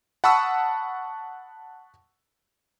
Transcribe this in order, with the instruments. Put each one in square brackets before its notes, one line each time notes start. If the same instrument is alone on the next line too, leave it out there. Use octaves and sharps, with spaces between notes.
[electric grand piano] F#5 A5 B5 C#6 D#6 E6